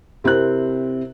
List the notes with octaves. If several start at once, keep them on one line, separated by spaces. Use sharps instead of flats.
C3 C4 E4 A#4 F#6